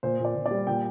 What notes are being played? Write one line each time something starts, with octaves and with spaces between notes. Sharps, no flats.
A#2 C5
A#2
D5
A#2
D5
G3
A#2 G5